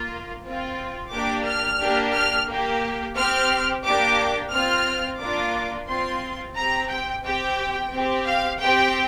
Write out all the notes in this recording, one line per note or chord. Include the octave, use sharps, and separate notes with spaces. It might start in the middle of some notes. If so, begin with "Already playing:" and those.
Already playing: A#3 F4
C4 F4
A#3 D4 G4 D6
F6
A#3 D4 G4
F6
A#3 G4
C4 G4 F6
A#3 D4 G4 D6
C4 F4 F6
A#3 D4 F4 D6
C4 F4 C6
C4 G4 A#5
G5
C4 G4 G5
C4 G4
F5
C4 G4 G5